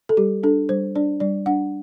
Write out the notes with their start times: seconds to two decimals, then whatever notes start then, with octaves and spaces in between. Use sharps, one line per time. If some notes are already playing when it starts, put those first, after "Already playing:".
0.09 A4
0.17 G3 G4
0.43 D4 A4
0.69 G3 C5
0.95 D4 D5
1.20 G3 D5
1.46 D4 F#5